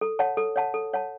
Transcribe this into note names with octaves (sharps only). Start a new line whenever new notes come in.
A4
C#5 F#5 A5
A4
C#5 F#5 A5
A4
C#5 F#5 A5